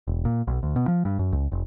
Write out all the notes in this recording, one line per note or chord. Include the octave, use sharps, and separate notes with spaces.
E1
A#2
B1
D2
B2
F3
G2
F#2
C#2
F1